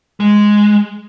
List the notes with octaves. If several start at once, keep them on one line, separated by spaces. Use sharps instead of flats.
G#3